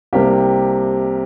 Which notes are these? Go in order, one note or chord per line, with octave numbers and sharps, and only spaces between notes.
C2 C3 G3 A#3 G4